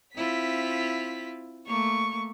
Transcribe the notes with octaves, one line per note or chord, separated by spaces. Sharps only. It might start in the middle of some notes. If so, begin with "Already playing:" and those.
C4 E4 F4 B6
A3 A#3 C#6